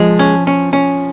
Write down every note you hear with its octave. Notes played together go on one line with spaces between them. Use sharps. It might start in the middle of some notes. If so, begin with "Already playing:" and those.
Already playing: F3 G#3
C#4
C#4
C#4